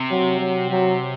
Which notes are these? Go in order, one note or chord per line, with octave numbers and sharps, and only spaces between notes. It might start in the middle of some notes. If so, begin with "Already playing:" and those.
Already playing: C3
F#3
F#3
F#3